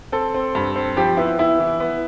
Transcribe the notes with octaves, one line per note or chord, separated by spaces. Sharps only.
C4 A4
C4
G2
C4
F3 G4
B3 E4
B3 E4
E3
B3